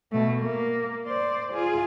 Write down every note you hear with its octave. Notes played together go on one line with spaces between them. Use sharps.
B2 A3
A#3
C5 D5
F4 G#4